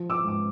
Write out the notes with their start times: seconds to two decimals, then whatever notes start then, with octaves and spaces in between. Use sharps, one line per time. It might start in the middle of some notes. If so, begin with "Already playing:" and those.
Already playing: F3
0.10 D6 E6
0.24 G#2 D6